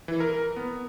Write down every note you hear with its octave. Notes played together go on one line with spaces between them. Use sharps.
E3
A#4
B3